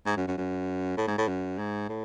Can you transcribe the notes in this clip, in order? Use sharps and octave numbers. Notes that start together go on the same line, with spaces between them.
G#2
F#2
F#2
F#2
A2
G#2
A2
F#2
G#2
A2